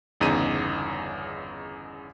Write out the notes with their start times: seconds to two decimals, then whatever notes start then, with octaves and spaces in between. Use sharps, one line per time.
0.21 G1 E2 C#3 D#4 D#7